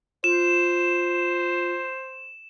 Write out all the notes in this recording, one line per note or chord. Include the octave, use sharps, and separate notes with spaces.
F4 C5 E7